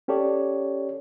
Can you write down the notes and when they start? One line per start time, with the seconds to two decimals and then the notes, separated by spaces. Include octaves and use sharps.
0.08 C#4 G4 A4 C#5 D5